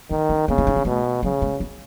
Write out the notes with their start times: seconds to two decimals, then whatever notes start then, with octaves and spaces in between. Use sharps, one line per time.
0.10 D#3 D#4
0.29 C#4
0.48 C#3 B3
0.58 E4
0.67 D#4
0.76 C#4
0.85 B2 A3
1.23 C#3 F#3
1.42 G#3
1.60 C#4